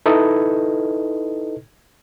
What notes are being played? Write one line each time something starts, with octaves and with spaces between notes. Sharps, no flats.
D#4 E4 A4 B4 D#5